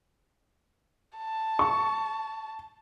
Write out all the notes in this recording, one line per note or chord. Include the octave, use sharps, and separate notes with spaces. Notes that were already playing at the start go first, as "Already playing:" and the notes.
A5
C#6